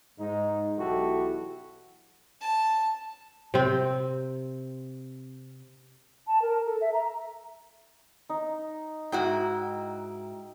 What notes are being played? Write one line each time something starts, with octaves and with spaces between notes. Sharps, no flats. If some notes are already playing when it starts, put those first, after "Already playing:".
G#2 D#4
B1 E3 E4 F#4 G4 A4
A5
C3 C4
A5
A#4
A4
E5
A#5
D#4
G#2 E4 F#4 G5